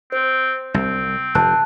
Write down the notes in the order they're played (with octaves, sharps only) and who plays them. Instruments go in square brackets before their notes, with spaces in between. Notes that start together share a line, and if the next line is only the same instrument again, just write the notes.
[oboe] C4 [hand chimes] C5
[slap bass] C2 [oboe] C4
[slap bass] F1 [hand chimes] A5 F#6